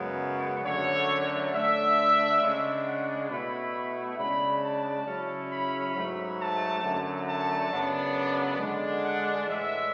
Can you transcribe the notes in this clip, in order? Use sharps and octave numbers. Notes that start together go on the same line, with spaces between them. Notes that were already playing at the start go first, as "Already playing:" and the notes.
Already playing: F#2 C#3 G#3 B3
F#2 D3 F#3 A3 C#5
D3 A3 D4 E5
C#3 G#3 D4
F#5
B2 A3 E4 B5
C#3 G#3 D4 B5
A5
C#3 F#3 C#4 E4
B5
G#2 F#3 A3
A5
F#2 D3 A3
A5
F#2 C#3 F#3 B3 D4
D5
D3 G#3 D4
F#5
A2 E3 G#3 E5